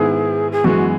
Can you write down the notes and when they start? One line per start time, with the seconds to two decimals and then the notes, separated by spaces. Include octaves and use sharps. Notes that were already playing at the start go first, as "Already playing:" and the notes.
Already playing: G#2 D#3 G#3 B3 E4 G#4
0.52 G#4
0.64 F#2 E3 G#3 B3 F#4